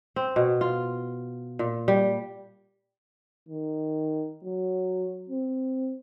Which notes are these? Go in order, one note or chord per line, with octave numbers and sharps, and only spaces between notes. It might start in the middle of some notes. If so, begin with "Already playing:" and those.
C4
B2
F4
A#2
G3
D#3
F#3
C4